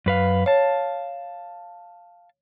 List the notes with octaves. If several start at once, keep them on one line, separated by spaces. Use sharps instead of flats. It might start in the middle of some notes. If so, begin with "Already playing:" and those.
F#2 B4 F5
C#5 F5 A5